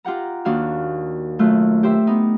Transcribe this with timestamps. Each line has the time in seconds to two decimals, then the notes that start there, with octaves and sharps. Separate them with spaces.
0.05 F4 G4 F#5 A#5
0.45 D#2 D4 F#4 F5
1.39 F#2 A3 F4 F#6
1.83 G4 C5 E5
2.07 B3 D#4